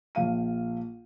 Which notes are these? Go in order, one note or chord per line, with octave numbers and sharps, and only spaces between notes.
A#1 F5 D#7